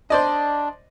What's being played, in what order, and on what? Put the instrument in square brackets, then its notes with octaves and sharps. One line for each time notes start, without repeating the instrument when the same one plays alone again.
[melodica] D4 [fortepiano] C5 D5 D#5